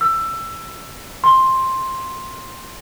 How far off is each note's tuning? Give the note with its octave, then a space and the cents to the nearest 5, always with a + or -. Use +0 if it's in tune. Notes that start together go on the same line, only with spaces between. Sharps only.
E6 +20
C6 +10